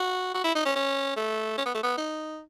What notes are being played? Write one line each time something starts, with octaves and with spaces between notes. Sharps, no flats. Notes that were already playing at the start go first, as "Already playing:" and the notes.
Already playing: F#4
F#4
E4
D#4
C#4
C#4
A3
C#4
B3
A3
B3
D#4